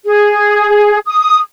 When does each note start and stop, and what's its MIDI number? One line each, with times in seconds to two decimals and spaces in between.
0.05 0.98 68
1.07 1.39 87